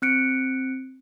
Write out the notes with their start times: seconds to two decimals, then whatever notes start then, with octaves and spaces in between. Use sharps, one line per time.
0.02 C4 F#6 C#7 D7